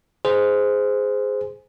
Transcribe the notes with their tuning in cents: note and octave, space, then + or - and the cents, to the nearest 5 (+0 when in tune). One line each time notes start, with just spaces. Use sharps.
G#4 +0 C5 -15